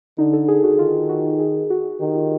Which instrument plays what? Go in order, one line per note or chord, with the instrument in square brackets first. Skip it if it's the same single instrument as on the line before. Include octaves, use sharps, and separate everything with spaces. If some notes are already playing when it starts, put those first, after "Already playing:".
[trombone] D3 [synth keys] D#4
[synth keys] A4
G#4
F#4
[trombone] D#3 [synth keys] F4
[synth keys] F#4
G#4
F#4
[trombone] D#3 [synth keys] G4
[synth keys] F4